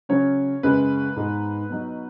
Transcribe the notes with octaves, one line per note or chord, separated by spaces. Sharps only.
C#3 F#3 C#4 C#5
F#2 C#3 G#3 B4
G#2 G#3 B3 D#4
B2 F#3 D#4